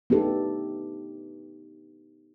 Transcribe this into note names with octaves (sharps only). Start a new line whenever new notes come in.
B3 D4 D#4 G4 A4